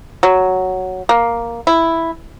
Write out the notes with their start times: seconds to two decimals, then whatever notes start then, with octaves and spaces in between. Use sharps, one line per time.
0.23 F#3
1.09 A#3
1.67 E4